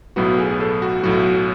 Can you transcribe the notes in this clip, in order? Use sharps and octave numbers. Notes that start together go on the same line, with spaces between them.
B1 A2 F#3 B3 F#4
G#4
A4
F#4
B1 A2 F#3 F#4